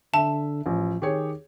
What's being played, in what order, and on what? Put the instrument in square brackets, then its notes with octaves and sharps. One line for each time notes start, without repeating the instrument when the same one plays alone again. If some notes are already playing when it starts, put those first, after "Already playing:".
[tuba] D3 [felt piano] E5 [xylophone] A5
[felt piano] A1 [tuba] F3
[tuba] D#3 [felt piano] G4 G#4 C#5